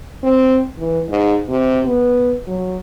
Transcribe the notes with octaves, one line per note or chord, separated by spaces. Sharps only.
C4
E3
G#2
C3
B3
F#3